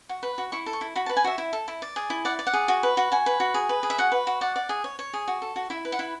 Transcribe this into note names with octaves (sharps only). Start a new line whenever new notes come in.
F#4
B4
F#4
E4 C#6
A4
C#6
E4
F#4 B5
A5
B4
G#5
F#4 E5
E4
A4
E4
D5
G#4
E4
D5 F#5
D5
F#5
G#4
F#4
B4
F#4
F#4 G#5
B4
F#4
G#4
B4
G#4
E5
F#4 F#5
B4
F#4
D5 F#5
D5
G#4
C#5
C#5
G#4
F#4
A4
F#4
E4 E5
B4
F#5
E4